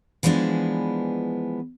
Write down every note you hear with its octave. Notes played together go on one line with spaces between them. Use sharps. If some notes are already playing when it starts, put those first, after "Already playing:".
E3 F3 G#3 B3 D4